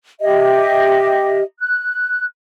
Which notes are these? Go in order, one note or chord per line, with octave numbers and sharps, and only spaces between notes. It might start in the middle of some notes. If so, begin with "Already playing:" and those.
G4 D#5 E5
F#6